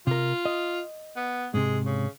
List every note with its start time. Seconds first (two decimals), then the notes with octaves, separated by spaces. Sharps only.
0.07 C3 F4 A#4
0.45 D#5
1.17 B3
1.54 G#2 C3 G#3
1.86 C#3